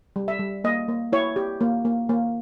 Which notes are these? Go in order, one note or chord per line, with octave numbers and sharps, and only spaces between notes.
G3
E5
G3
A#3 D#5
A#3
E4 C#5
G4
A#3
A#3
A#3